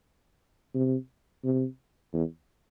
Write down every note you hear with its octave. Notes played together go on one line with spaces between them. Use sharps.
C3
C3
E2